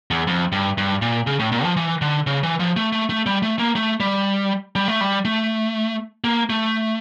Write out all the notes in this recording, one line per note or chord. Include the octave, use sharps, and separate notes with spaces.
E2
F2
G2
G2
A#2
C#3
A2
A#2
F3
E3
D3
C#3
E3
F3
A3
A3
A3
G3
A3
A#3
A3
G3
G3
A3
G3
A3
A#3
A3